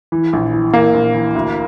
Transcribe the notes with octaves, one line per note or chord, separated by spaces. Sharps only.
E3
A#1
E3
E3 A#3
A#1
E3
D2